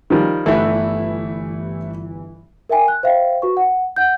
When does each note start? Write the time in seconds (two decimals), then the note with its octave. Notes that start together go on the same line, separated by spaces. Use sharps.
0.10 D#3 F3 G3
0.46 G1 E3 A3 E4
2.69 A#4 E5 G5 G#5
2.88 F#6
3.03 C5 E5 F5 G5
3.42 F#4 B4 C#6
3.57 F#5
3.96 F#5 G6